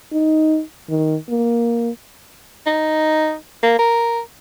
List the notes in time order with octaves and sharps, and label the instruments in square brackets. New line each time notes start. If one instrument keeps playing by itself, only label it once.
[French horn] D#4
D#3
A#3
[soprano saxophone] D#4
A#3
A#4